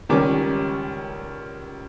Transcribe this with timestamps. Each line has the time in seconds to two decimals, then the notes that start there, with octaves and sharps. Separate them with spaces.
0.09 C#2 D#3 G3 C#4 D6